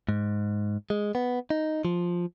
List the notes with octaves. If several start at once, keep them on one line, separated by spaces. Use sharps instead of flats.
G#2
G#3
B3
D#4
F3